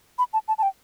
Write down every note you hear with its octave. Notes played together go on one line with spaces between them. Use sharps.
B5
A5
A5
A5
G5